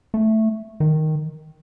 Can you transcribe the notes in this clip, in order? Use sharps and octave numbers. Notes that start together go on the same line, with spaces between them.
A3
D#3